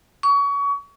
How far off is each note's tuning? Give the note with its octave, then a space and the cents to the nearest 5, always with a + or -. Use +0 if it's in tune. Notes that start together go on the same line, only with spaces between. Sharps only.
C#6 +30